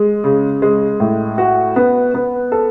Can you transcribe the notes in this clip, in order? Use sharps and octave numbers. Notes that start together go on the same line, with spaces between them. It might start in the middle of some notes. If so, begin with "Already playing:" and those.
Already playing: G#3
C#3
G#3
A2
F#4
B3
B3
A4